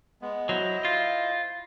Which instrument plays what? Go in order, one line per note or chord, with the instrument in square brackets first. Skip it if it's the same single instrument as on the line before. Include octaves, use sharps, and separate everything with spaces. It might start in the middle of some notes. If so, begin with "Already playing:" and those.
[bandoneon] G#3 B3
[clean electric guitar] F#3 [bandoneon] E4 C5 D#5
[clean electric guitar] F4